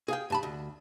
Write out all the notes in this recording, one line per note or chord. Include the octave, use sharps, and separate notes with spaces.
G#4 F5 G5
G2 A5 B5
D2